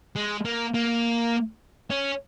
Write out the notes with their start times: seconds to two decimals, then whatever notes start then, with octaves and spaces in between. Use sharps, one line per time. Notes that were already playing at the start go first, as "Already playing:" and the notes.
0.16 G#3
0.45 A#3
0.74 A#3
1.90 C#4